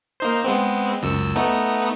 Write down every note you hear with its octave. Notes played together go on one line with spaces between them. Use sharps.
A#3 D#4 C5
G#3 B3 C4
C#2 F#2 E6
A3 B3 D#4